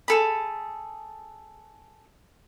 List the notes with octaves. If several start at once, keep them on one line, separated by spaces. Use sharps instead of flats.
G#4 A4 B5